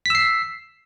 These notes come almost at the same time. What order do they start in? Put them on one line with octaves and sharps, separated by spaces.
B6 E6 C7